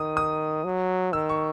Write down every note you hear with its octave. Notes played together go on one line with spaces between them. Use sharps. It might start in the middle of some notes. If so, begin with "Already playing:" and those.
Already playing: D#3 D#6
D#6
F#3
D#3 E6
C#6